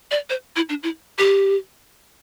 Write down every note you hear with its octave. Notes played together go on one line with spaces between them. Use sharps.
D5
C5
E4
D4
E4
G4